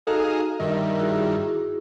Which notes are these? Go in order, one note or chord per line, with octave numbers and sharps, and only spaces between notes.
D#4 F#4 G#4 A4 D#5 F5 A#5
G2 D#3 A#4 D#5 E5
E4 F#4 G#4